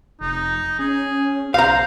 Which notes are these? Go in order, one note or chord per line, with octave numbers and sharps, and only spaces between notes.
F1 D#4
C#4 G#4
B1 C5 F5 A#5